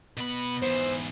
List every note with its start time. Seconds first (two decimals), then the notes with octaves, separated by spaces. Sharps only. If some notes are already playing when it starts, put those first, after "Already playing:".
0.17 B2 B3 B5
0.62 G#2 E3 C5